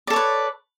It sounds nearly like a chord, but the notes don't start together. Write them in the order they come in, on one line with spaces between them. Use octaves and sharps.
D5 A4 C#5 B4